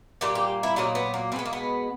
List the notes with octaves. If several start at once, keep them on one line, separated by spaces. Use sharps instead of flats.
A#2 G3 A#3 G4
G4
E4
A#2 F#3 A#3 D#4
B3
A#3
B2 G#3 B3 C4
A#3
B3